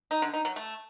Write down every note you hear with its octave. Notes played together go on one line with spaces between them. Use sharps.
D#4
D3
D#4
F#3
A3